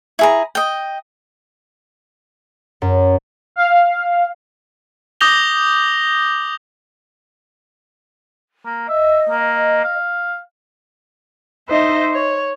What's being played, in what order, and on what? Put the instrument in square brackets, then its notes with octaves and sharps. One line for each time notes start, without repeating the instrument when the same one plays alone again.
[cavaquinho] E4 G#4 A#5
D#5 G5
[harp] F#2
[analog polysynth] F5
[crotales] D6 D#6 G6 A#6 F7 G7
[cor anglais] A#3
[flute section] D#5 [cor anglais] E5
[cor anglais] A#3
F5
[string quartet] D#4 C5 D#5 E5
C#5